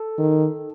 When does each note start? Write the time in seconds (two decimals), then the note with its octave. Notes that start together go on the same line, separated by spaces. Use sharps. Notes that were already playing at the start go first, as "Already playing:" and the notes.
Already playing: A4
0.18 D#3